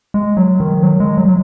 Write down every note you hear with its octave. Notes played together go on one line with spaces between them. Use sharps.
G#3
F#3
D#3
F#3
G#3
F#3
F#3